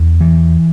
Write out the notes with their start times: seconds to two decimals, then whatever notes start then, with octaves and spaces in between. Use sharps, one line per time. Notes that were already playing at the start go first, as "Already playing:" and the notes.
Already playing: E2
0.21 E3